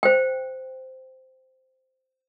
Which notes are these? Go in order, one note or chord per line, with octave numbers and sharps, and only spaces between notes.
C5 G5